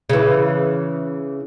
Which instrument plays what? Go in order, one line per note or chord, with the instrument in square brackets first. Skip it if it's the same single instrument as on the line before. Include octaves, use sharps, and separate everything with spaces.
[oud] C#3 E3